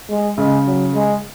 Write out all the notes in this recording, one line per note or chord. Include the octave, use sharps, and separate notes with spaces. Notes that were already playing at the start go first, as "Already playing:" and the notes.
G#3
C#3 G#3
F#3
G#3